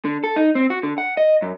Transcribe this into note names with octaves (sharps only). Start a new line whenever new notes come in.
D3
A4
D#4
C4
F#4
D3
F#5
D#5
F#2